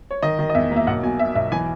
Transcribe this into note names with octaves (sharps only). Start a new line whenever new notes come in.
C#5
D#3 D#5
D#3
D#5
E2 E5
A#3
E5
B1 F#5
B2 G#5
B2 E5
B1 E5
E3 G#5